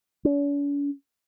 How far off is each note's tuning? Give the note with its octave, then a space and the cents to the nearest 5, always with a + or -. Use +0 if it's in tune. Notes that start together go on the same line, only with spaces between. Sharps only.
C#4 +45